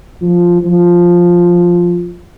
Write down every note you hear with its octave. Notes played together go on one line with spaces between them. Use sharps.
F3
F3